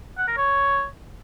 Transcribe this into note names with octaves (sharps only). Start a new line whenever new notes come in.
F#5
A#4
C#5